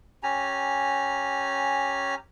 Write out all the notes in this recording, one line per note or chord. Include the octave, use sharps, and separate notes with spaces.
C#4 G4 G#5 A#5